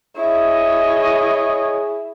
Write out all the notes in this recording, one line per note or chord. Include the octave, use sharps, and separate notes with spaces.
E4 G#4 C#5 D#5